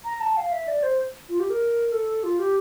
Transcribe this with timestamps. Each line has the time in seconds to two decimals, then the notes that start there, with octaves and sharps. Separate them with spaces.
0.05 A#5
0.21 A5
0.37 F5
0.52 E5
0.68 D5
0.83 C5
1.29 F4
1.40 G4
1.50 A#4
1.92 A4
2.24 F4
2.39 G4